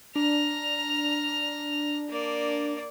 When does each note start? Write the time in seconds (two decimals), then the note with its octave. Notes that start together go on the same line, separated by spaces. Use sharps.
0.16 D4 A#5 F6
2.09 A#3 D5